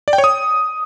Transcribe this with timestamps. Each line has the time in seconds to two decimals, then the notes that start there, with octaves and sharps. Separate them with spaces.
0.08 D5
0.13 G5
0.18 C#5
0.24 D#6